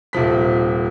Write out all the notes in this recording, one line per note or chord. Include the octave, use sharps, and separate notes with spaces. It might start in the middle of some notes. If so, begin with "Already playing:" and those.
D#1 C3 F3 B6